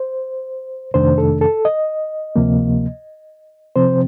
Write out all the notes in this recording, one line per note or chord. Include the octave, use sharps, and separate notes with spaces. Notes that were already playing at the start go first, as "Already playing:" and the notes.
Already playing: C5
F2 C3 D#3 A3 D4 C5
A4
A4
D#5
D2 C3 F3 A#3
C3 F3 C4 C5